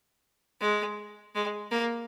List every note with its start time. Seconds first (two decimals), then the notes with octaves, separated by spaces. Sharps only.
0.61 G#3
1.35 G#3
1.71 A#3